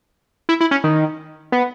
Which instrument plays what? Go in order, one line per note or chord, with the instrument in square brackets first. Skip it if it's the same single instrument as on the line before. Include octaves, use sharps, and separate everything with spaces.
[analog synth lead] E4
E4
C#4
D#3
B3